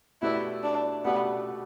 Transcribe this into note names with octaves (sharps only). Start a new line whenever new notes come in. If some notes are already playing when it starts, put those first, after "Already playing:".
B2 A3 E4 G4 B4 D5
D4
B2 A3 B3 G4 B4 D5